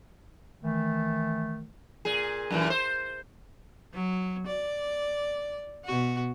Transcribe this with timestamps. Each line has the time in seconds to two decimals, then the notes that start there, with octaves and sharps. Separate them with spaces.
0.62 D#3 E3 A3
2.05 A#2 G#4
2.51 F#2 A#2 E3
2.70 C5
3.94 F#3
4.47 D5
5.85 B2 F#4